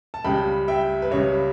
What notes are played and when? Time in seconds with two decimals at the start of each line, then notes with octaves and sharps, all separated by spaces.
0.14 A5
0.24 C#2 C#3 G3 G5 B5
0.68 E5 G5
1.02 B4
1.11 C#2 C#3 G3 C#5